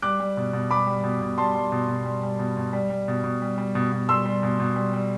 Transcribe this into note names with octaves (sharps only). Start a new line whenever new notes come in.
G3 D6 F#6
G3
B2
B2
G3 B5 D6
G3
B2
B2
G3 A5 C6
G3
B2
B2
G3
G3
B2
B2
G3
G3
B2
B2
G3
G3
B2
B2
G3 C6 E6
G3
B2
B2
G3
G3